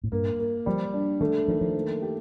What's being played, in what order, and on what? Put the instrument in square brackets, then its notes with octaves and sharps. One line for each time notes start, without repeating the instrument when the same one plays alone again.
[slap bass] A2
[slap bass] G2 [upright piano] A#3
[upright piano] A#3
[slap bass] F3 [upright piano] G3
[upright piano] D4
[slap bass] D#3 [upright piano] A3
[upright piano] D#3 [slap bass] F3
[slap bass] F3
[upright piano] A#3
G4